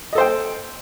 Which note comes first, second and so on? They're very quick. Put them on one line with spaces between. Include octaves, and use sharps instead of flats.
D#5 A4 C5 G5